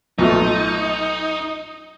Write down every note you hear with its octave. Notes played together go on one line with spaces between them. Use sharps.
B1 A#2 A3 D#4